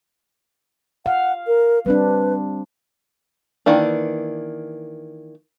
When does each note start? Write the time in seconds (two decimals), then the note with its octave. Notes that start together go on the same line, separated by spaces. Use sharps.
1.06 F5 F#5
1.47 A#4
1.86 G3 C4 D4 B4
3.66 D#3 E3 A#3 D4